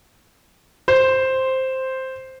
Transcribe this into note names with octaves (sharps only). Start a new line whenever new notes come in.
C5